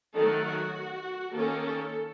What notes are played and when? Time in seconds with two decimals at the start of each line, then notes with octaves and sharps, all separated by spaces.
0.16 D#3 F#3 A3 A4
0.46 F#4
1.35 D#3 A#3 C#4 A4
1.64 A4